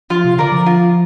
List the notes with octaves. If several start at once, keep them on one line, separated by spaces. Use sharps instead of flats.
F3 F4
C3
D3 A#4 D5
F3
F4